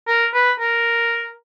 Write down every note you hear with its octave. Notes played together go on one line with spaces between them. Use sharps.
A#4
B4
A#4